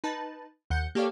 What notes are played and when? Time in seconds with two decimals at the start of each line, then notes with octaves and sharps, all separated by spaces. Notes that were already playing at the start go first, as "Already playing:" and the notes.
0.04 D#4 B4 A5
0.70 D#2 F#5 G6 C#7
0.95 A#3 G4 A4 C#5 D5 F5